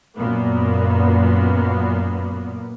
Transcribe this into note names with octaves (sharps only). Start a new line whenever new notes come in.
F#2 A#2 A#3 B3